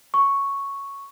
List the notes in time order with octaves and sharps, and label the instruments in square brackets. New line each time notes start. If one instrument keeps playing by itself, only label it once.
[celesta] C#6